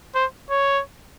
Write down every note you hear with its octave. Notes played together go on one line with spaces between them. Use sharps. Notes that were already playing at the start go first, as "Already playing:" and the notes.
C5
C#5